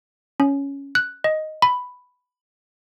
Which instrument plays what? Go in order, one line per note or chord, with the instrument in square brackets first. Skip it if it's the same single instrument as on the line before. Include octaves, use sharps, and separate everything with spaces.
[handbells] C#4
F#6
D#5
B5